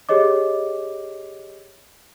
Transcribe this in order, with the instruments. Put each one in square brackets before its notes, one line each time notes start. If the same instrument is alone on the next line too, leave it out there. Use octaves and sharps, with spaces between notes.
[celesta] G4 G#4 C#5 D#5 D6